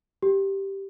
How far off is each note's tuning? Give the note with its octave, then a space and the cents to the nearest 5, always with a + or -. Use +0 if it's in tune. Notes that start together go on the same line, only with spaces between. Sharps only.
G4 -5